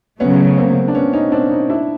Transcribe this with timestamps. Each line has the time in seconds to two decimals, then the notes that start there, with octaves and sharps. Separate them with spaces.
0.20 C#3 F#3 A3 B3 C#4
0.58 A#3 C4
0.88 D4
0.95 B3 C#4
1.13 C#4 D#4
1.32 C4 D4
1.51 C#4 D#4
1.70 D4 E4